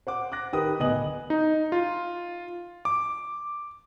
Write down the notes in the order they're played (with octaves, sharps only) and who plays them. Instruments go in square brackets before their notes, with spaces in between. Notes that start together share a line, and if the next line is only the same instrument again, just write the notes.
[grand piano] C5 F#5 D6
D6 F#6 A#6
D#3 G4 A#4 B4 D#6
D1 B3 D#5 G#5 D#6 F#7
[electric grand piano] D#4
F4
D6